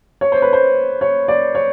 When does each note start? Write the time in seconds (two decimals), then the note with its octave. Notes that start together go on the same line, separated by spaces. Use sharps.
0.21 C#5
0.32 C5
0.42 B4
0.53 C5
1.01 C#5
1.28 D5
1.55 C#5